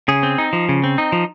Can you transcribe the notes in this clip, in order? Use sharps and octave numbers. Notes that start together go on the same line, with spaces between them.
C#3 G#4
C4
D#4
F3
C#3
C4
D#4
F3